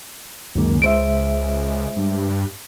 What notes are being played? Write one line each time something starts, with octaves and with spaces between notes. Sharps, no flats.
C#2 F#2 D#3 A#3
G#3 C5 E5 D7
G2